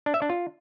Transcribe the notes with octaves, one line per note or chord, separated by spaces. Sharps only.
D4
E5
D4
F4